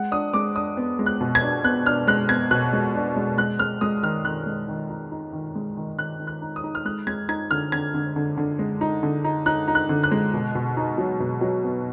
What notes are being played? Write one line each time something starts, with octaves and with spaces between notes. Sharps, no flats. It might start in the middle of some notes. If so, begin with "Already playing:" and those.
Already playing: G#3 F#5
D4 D#6
G#3 D6
D4 D#6
B3
G#3
F#6
B2
G#6
D4
B3 F#6
D4 F6
G#3 F#6
B3 G#6
B2 F#6
G#3
D4
G#3
G#3 F#6
G#3 F6
G#3 D#6
D#3 F6
D#3 F#6
G#3
D#3
D#4
D#4
D#3
G#3
D#3
D#3 F#6
D#3
F#6
D#4
D#6
D#4
F6
G#3 F#6
G#3 G#6
D#4 G#6
D3 F6
D3 G#6
D3
D3
D3
G#3
D#4
D3
D#4
D#4 F#6
D#4
F#6
D3
F#6
G#3
B2
B2
D#4
F#3
B2
F#3
B3